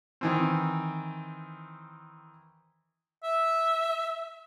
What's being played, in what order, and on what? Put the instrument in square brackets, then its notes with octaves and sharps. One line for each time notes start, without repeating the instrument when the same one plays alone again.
[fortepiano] D#3 E3 C4
[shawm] E5